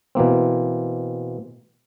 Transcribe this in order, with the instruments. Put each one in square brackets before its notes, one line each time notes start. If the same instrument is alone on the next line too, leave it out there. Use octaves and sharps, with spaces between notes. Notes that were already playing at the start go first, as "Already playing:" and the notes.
[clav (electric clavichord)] B2 E3 A#3 C4